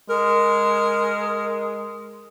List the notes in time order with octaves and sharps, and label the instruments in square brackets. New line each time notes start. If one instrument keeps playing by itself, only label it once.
[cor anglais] G#3 [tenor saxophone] A#4